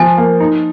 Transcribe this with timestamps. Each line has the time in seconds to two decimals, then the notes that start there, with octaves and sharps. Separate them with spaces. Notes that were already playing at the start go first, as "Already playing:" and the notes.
Already playing: F3 G#5
0.17 A#3
0.40 D#4